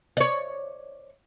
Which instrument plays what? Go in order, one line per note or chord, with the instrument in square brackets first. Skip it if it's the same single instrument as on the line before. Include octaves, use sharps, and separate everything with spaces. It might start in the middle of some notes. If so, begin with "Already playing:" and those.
[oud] C#5 D5